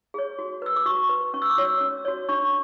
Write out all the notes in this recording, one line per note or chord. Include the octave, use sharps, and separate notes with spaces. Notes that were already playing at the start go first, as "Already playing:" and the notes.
G#4 C#5
F#4
B4 E6
D6
F#4 C#6
B4
C#4 C#6
E6
D6
F#4 C#5
E6
C#4
F#4 C#5
D4 C#6